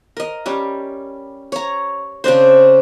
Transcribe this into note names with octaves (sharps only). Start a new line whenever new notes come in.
A#4 D#5
G3 C#4
C#5 A#5
C#3 C4 D4 C5